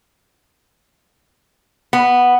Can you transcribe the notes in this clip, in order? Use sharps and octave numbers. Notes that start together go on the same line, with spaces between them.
B3